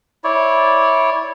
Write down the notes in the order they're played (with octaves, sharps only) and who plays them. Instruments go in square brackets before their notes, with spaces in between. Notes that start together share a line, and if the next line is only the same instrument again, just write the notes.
[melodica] E4 C#5 D5